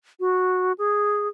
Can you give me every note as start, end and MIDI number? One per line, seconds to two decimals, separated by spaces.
0.20 0.72 66
0.78 1.28 68